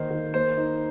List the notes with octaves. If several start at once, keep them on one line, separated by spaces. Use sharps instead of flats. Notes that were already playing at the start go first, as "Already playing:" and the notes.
Already playing: D#3 A#3 D#4 C5
D#3
A#3 C5
D#4